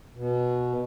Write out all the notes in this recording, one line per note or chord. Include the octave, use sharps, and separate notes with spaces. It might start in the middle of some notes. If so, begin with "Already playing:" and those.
B2